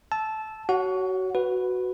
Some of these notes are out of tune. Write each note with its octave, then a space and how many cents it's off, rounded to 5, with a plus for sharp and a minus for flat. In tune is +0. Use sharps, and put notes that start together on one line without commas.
A5 -15 E6 +0
F#4 +25 C#5 +5 F#5 -20
F#4 +0 B4 +5